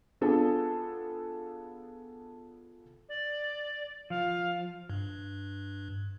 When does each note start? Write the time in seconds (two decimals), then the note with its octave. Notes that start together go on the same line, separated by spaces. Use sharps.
0.21 B3 D4 F4 G#4 A4
3.09 D5
4.10 F3 F5
4.90 G2